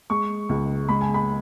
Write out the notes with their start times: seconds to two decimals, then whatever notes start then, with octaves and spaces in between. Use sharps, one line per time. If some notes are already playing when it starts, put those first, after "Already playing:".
0.10 G#3 C#6
0.49 C#2
0.89 G#3 B5
1.01 G#5
1.14 B5